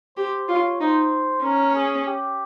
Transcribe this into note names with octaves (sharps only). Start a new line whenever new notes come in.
G4 C5
F4 C#5
D#4 C5
C#4 A#4
G#4
G4